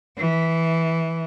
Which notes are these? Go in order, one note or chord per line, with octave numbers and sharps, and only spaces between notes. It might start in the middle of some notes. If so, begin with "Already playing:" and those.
E3